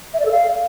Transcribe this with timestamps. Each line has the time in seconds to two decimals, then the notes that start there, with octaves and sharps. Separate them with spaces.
0.14 E5
0.20 D5
0.26 A4
0.31 F5